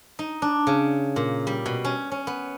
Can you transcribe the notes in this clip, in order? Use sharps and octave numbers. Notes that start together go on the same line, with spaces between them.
D#4
D4
C#3
A#2
G3
B2
C#4
C#4
B3